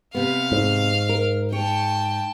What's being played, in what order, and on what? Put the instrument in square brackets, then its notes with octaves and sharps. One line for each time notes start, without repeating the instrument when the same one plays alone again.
[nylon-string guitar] C3 B3 [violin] F5
[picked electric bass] G#2
[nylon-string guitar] A#4
[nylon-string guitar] C#5 [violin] G5 A5